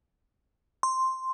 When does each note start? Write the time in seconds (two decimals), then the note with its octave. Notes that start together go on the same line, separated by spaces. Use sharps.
0.83 C6